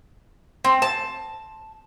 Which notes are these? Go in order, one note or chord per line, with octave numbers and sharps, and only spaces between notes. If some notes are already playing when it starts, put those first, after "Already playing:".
C4
A5